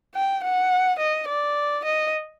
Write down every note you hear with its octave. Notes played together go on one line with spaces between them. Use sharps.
G5
F#5
D#5
D5
D#5